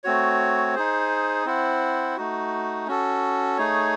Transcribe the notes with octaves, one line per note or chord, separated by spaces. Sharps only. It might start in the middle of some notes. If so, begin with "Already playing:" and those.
A3 C4 F#4 C#5
D#4 G#4 C5
C4 E4 C5 F#5
A3 D#4 F#4
C#4 F#4 A4
A3 D#4 G#4 C#5